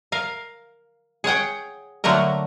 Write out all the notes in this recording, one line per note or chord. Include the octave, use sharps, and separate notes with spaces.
A#4 F5
G#4 C#5 F#5 G5
D3 F#3 A3 A#3 A#4